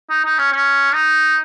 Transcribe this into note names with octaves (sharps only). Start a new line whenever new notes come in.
D#4
D#4
C#4
C#4
D#4